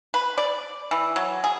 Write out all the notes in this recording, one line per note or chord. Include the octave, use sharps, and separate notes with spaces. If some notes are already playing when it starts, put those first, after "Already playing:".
B4
D5
E3
F#3
G#4